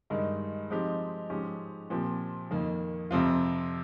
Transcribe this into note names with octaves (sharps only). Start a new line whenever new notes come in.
G2 D#3 G#3 D#4
F3 G#3 C4 D#4 G4
G#2 F3 G#3 C#4 G4
A#2 F3 C4 G4
F2 D#3 A#3
F2 C3 F3 C4 F4